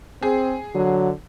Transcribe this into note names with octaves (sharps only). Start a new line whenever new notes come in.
C4 G#4
D3 F#3